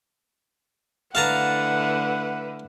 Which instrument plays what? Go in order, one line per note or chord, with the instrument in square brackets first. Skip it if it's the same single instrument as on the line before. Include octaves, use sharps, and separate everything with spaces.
[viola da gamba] D3 A3 E4 [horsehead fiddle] B4 [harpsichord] F5 A5 A#5 [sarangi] F#5